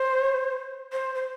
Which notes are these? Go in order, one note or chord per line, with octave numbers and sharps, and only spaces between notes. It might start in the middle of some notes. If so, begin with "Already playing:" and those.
Already playing: C5
C5
C5